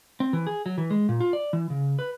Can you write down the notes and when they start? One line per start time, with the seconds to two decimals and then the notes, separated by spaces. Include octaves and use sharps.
0.20 C4
0.33 E3
0.47 G#4
0.66 F#3
0.78 E3
0.90 G#3
1.09 A#2
1.20 F4
1.33 D5
1.53 E3
1.70 C#3
1.99 B4